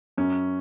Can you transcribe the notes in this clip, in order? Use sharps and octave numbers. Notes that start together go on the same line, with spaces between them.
F#2 C#4